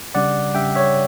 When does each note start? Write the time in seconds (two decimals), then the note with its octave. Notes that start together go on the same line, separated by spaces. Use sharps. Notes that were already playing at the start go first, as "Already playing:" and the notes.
0.15 C#3 G3 D4 D5 F#5
0.55 C#3 G3 D4 E5 G5
0.75 C#5 E5